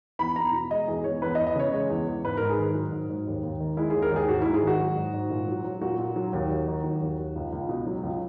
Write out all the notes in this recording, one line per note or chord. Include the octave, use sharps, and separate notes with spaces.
E2 B5
E2 A#5
B2
G#3 D#5
E2 G#4
E2 C#5
E2 B4
D#5
E2
D#5
C#3 C#5
G#3
E2
E2
G#2 B4
G#2 A#4
G#4
D#3
F#3
G#2
G#2
D#2
D#2
D#3
G#3 E4
D#2 G#4
A#4
D#2
G#4
G#2 F#4
G#2 E4
G#4
D#3
F#4
F#3
G#2
G#2
A#2
F#3
F#3
A#2 F#4
A#2
F#3
D#2
D#2
D#3
F#3
D#2
D#2
C#2
C#2
B2
F#3
C#2